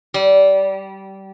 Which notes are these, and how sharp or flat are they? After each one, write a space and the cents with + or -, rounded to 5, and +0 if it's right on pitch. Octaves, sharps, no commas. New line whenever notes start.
G3 -20